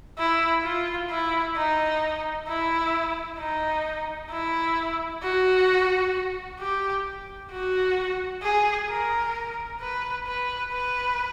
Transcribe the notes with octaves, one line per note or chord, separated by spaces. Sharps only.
E4
F4
E4
D#4
E4
D#4
E4
F#4
G4
F#4
G#4
A#4
B4
B4
B4